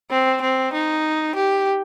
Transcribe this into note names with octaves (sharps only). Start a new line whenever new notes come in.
C4
C4
D#4
G4